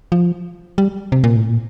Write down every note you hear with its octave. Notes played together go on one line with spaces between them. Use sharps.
F3
G3
C3
A#2
A2
A#2